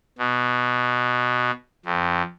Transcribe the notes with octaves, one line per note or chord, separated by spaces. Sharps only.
B2
F2